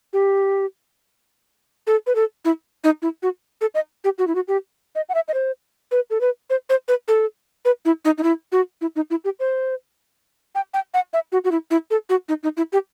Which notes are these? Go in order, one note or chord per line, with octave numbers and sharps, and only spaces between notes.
G4
A4
B4
A4
E4
D#4
E4
F#4
A4
D#5
G4
F#4
E4
F#4
G4
D#5
F#5
E5
D#5
C5
B4
A4
B4
C5
C5
B4
A4
B4
E4
D#4
D#4
E4
F#4
E4
D#4
E4
G4
C5
G5
G5
F#5
E5
F#4
F#4
E4
E4
A4
F#4
D#4
D#4
E4
G4